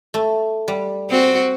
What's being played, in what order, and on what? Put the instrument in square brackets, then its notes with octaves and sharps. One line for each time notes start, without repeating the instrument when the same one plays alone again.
[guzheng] A3
G3
[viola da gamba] C4 F#4